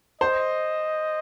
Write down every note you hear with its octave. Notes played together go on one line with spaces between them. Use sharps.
C5 D#5